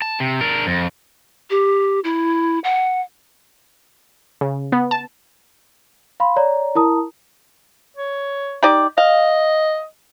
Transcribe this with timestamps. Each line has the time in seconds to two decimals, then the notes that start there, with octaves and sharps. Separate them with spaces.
0.02 A5
0.20 C3
0.41 D4 A#4
0.67 F2
1.50 G4
2.04 E4
2.64 F#5
4.41 C#3
4.72 B3
4.91 A5
6.20 F5 B5 C6
6.36 C#5 D5 A#5
6.75 E4 A#4 A5 A#5 D#6
7.97 C#5
8.63 D#4 G4 D5
8.98 D#5 F5